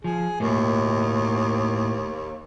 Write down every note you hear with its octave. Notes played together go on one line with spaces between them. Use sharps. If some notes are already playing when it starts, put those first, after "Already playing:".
F3 G#4
D#2 A2 A#3